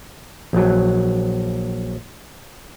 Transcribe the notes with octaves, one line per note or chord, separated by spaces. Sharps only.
A#1 F#3